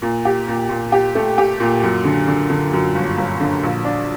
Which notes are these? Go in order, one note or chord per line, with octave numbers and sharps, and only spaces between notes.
A#2
G4
A#2
A#2
G4
A3
G4
A#2
F#2
D3
D3
D3
F#2
G1
G1
D3
A#1
D4